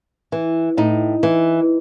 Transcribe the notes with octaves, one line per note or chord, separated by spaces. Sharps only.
E3
A2 D#4
E3